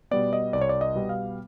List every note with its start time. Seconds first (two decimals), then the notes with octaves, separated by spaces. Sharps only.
0.11 B2 G3 B3 D5
0.33 D#5
0.53 C2 D5
0.61 C#5
0.69 D5
0.81 D#5
0.95 B2 G3 B3
1.09 F5